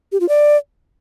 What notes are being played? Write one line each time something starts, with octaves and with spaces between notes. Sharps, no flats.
G4
F4
D5